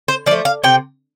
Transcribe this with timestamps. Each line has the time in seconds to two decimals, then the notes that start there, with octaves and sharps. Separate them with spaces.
0.08 C5
0.26 F3 D5
0.31 A3
0.45 F5
0.64 C3 G5